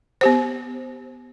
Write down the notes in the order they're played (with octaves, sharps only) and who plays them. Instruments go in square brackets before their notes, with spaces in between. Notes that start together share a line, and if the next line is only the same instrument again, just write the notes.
[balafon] B3 G4 C5